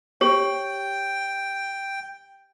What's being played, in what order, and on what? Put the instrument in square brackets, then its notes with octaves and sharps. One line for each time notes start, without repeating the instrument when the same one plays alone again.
[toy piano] G4 C#5 [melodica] G5